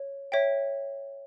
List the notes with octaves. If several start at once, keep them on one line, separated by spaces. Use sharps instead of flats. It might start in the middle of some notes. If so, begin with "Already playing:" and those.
Already playing: C#5
C#5 E5 G5